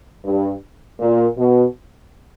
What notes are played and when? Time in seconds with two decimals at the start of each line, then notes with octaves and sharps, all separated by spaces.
0.24 G2
1.00 A#2
1.37 B2